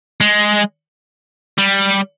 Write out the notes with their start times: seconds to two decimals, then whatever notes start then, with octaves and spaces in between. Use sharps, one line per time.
0.21 G#3
1.58 G3